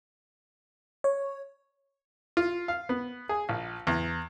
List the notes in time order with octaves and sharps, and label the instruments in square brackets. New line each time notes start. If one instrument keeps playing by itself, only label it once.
[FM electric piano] C#5
[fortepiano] F4
F5
B3
G#4
A#1
E2